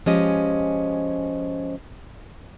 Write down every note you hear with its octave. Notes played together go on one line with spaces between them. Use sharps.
F3 G#3 C#4 G4 D#5